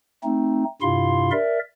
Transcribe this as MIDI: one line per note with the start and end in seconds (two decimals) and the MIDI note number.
0.24 0.64 57
0.24 0.64 60
0.24 0.64 63
0.82 1.31 43
0.82 1.31 48
0.82 1.31 64
0.82 1.31 65
0.82 1.31 77
0.82 1.31 84
1.31 1.59 70
1.31 1.59 74
1.31 1.59 76